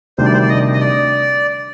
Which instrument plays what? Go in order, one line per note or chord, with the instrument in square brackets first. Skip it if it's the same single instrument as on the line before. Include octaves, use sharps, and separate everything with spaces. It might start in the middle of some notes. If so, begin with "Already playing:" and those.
[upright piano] D2 C3 D#3 G3 D4 [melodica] C5
[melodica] D5
C5
D5
D#5
D#5
D5